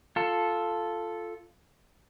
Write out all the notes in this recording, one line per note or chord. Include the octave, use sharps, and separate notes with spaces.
F4 A4